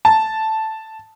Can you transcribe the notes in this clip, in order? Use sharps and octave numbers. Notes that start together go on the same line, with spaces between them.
A5